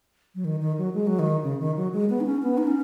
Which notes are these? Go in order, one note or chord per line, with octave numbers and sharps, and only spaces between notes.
F#3
D#3
D#3
F#3
G#3
F#3
D#3
C#3
D#3
F#3
G#3
B3
D#4
C#4
B3
D#4
C#4